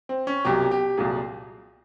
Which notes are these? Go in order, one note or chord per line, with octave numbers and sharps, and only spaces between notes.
C4
C#4
C2 B2 F#3 G4
G4
C2 A#2 F#3 G#4